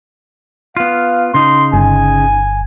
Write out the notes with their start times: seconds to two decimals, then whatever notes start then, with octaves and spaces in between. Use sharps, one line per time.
0.77 B3 F4 F5
1.34 C#3 D#4 C6
1.74 G1 G#5